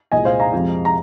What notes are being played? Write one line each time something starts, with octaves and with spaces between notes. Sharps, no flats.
C2 A#2 G#3 D#5 G#5
C5 F5
F5 A#5
F2 C3 F3 G#3
A#5